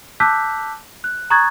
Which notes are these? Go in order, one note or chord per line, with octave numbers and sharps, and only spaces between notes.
A5 D6 E6 F#6 G6 B6
F#6
A#5 C#6 D#6 F#6 G#6 A6